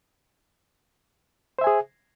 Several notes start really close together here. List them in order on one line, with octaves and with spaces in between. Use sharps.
C5 E5 G#5 G#4